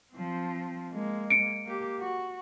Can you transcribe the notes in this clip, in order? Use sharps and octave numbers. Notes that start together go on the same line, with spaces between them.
F3 C4
G#3 A#3
C#7 D7
A#3 G4
F#4